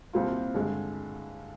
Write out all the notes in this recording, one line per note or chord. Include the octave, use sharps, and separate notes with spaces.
C2 A#2 G3 C4 F4
G2 D3 G#3